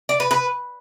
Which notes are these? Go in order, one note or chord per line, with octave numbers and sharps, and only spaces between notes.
D5
B4
B4